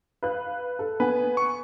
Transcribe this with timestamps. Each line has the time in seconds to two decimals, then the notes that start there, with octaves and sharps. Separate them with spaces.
0.23 B4 F5 F#6
0.79 A4
1.00 B3 B4 G#5
1.37 C#6